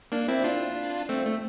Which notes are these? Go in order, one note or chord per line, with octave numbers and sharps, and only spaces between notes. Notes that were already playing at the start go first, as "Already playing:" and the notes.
A#3 D4
C4 E4
D4 F4
A3 C4
A3